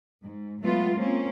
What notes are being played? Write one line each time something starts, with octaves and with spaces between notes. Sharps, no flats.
G#2
F#3 G#3 A3 B3 F4
A#3 C4 C#4